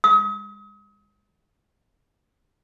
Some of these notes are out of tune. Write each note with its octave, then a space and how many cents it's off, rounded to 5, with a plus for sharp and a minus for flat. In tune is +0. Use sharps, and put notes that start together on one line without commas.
D#6 +40